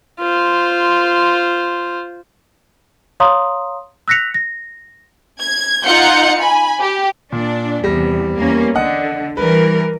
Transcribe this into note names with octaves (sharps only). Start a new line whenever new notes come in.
F4 C5
C#5 F5 A#5 C6 D#6
E6 F#6 A#6 B6 C#7 F7
A#6
G#6
D#4 F4 F#5 G6 C#7
G#5 B5
G4
A#2 D4
E2 C3 G3 A#6
E2 A#3 C#4
D3 D#5 F#5
E3 G3 A#4 B4